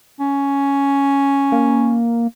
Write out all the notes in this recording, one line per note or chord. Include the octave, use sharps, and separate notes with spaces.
C#4
A#3